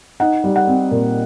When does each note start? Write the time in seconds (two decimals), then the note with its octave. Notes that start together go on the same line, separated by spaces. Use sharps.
0.20 D#4 F#5
0.44 G3
0.56 F#5
0.68 C4
0.91 A#2